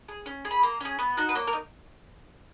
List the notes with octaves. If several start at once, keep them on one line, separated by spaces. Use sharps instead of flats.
G#4
C#4
G#4
B5
A#3 A#5
C#4 G#4
B3
D#4 F#4
B4
A#3 C#5
A#4
D#4